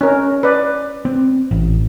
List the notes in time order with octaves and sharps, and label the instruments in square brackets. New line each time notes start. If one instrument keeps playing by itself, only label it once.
[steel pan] C#4 A#4
B4 D5
[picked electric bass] C4
A1